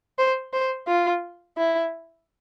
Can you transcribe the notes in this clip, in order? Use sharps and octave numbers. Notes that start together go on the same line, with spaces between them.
C5
C5
F4
E4